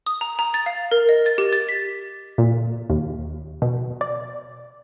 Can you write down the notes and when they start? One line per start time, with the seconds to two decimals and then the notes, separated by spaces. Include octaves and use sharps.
0.06 D#6
0.21 A#5
0.39 A#5
0.54 A6
0.66 F5
0.91 A#4
1.09 D#5
1.26 A6
1.38 G4
1.53 A6
1.69 B6
2.38 A#2
2.90 D#2
3.62 B2
4.01 D5